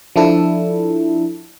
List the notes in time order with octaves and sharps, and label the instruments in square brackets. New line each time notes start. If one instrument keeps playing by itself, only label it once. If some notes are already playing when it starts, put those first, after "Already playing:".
[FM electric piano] F3 D4 E4 A4